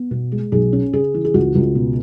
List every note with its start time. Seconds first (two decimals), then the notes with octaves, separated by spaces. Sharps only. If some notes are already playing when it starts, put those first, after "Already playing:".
Already playing: B3
0.11 B2
0.32 G#3
0.52 B1 G#4
0.73 C#4
0.93 C#3 G#4
1.14 E3
1.24 G#4
1.34 C#2 F#4
1.55 C#2
1.75 B2